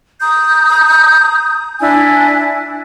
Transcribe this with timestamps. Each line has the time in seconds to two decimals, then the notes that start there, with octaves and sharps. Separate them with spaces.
0.20 A#5 D#6 G6
1.80 D4 E4 G#5